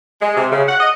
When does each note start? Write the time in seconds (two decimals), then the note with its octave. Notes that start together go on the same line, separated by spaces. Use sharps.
0.21 G#3
0.36 C3
0.52 C#3
0.68 F#5
0.80 D#5